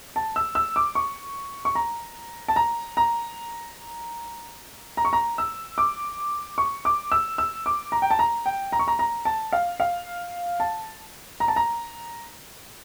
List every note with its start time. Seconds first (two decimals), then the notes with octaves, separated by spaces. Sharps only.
0.16 A5
0.36 E6
0.55 E6
0.76 D6
0.95 C#6
1.65 C#6
1.75 A#5
2.48 A5
2.56 A#5
2.97 A#5
4.97 A#5
5.05 C#6
5.13 A#5
5.38 E6
5.78 D6
6.58 C#6
6.85 D6
7.12 E6
7.38 E6
7.66 D6
7.92 A#5
8.02 G5
8.10 A5
8.19 A#5
8.46 G5
8.72 A#5
8.79 C#6
8.88 A#5
8.99 A#5
9.25 A5
9.53 F5
9.80 F5
10.60 A5
11.40 A#5
11.48 A5
11.56 A#5